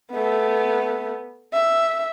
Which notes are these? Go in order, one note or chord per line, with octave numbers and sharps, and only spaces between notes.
A3 B3
E5